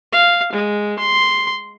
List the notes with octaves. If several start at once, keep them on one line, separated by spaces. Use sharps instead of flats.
F5
G#3
C6